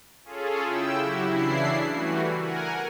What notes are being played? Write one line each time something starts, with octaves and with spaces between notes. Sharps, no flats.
C#4 F4 G#4 A4
C#3 E4 G5 E6
F#3 E4 F#4 G4
C#3 E3 D4 E4 C7
E3 G3 A3 F#4
A#4 F#5 G#5